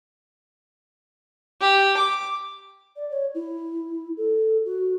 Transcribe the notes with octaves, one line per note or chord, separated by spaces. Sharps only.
G4
D6
D5
C#5
E4
A4
F#4